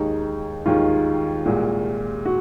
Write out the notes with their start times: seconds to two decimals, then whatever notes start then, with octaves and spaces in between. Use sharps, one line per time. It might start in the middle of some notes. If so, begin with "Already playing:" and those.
Already playing: D#2 D#3 G#3 D#4
0.65 D#2 D#3 G#3 F4
1.46 C2 A#2 G#3
2.25 F#4